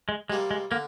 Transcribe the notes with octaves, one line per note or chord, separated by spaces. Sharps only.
G#3
C3 G3 G#3 A#3
G#3
D3 A#3